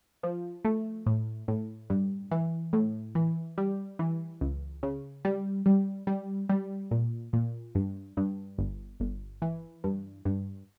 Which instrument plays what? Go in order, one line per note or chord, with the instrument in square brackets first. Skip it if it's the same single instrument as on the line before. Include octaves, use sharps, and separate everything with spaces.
[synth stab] F3
A3
A2
A2
G2
E3
A2
E3
G3
E3
C#2
C#3
G3
G3
G3
G3
A#2
A#2
G2
G2
G1
G1
E3
G2
G2